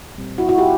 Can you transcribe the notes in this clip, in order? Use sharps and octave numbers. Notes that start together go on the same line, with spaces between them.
A#2 G3 C4
E4 F#4
E4 F#4
F4 G4